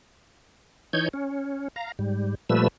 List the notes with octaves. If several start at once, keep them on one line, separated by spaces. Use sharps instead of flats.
E3 D#4 C#5 G6 G#6
C#4
F5 A#5
G#2 G3
A#2 F3 G3 A3 B4 E6